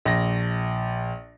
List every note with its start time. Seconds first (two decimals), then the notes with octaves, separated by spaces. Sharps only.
0.05 A#1 A#6